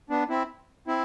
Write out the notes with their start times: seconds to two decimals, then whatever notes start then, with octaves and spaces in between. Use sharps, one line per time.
0.10 B3 D4
0.29 C4 E4
0.87 C4 E4